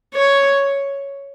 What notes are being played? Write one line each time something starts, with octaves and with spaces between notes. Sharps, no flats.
C#5